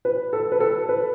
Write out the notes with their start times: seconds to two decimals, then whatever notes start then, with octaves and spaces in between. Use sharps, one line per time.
0.05 B4
0.33 A4
0.52 B4
0.60 A4
0.89 B4